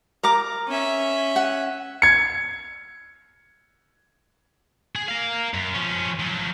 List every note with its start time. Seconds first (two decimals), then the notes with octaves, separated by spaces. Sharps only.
0.23 A#4 A#5 D6
0.69 C#4 E5
1.36 F#5
2.02 G#6 C#7
4.96 G#4
5.08 A#4 F5
5.54 F#2
5.74 F3 C#4
6.20 F3 F#3